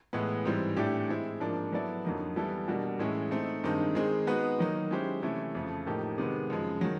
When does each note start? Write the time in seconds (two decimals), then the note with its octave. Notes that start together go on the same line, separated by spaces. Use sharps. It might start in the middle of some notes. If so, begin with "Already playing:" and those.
0.13 A2 E3 G#3 B3
0.45 G#2 E3 G3 C4
0.77 A2 E3 A3 D4 G4
1.09 G#3 C4 E4
1.40 G#2 F3 A#3 D4
1.72 F#3 B3 E4 A4 D5
2.05 F2 D3 F#3 A#3 D#4
2.36 E3 G3 B3 E4 A4
2.68 B2 G3 A#3 D4 F#4
2.99 A2 E3 G#3 C#4 E4
3.31 A3 C4 D#4
3.64 G2 D#3 G#3 C4 D#4
3.95 D#3 G#3 C4 D#4 G#4
4.27 G#3 B3 D#4 F#4 B4
4.59 D#3 F#3 A#3 D#4
4.91 G#3 C#4 E4 G4 C5
5.22 C3 E3 A3 C#4 E4
5.55 F2 C#3 F3 A3
5.86 A2 F3 A#3 D#4 G4
6.18 C3 D#3 G#3 B3
6.50 F#2 C#3 F3 G#3
6.81 D#3 F#3